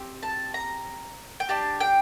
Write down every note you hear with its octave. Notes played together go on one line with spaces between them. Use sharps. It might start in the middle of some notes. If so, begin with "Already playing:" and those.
Already playing: C4 G4
A5
A#5
G5
D4 G4 A5
G5